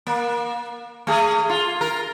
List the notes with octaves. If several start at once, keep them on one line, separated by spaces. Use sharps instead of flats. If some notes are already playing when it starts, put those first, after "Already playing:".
A#3
A3 G#4
F4
A#4